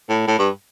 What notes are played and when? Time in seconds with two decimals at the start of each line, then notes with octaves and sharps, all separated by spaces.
0.09 A2
0.27 A2
0.38 G2